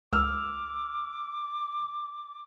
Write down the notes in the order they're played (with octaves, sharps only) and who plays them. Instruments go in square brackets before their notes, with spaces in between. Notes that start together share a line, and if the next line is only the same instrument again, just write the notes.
[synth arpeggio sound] C#2 [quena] D6 [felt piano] E6 F6